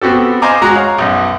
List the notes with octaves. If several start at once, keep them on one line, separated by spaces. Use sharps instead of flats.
B3 C4 F#4 G4 A4
C5 D#5 F5 G#5 A#5 D6
G#3 F#4 A#5 F#6
C#5 F5
B1 F#2